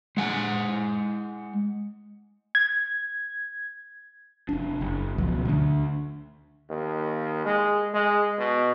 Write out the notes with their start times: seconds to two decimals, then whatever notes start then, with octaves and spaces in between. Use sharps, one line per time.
0.17 G#3 F#5 G#5
2.55 G#6
4.49 F1 D4
4.81 F#1
5.18 C#2 B2 F3 F#3
5.45 D2 D3
6.70 D#2
7.45 G#3
7.94 G#3
8.38 B2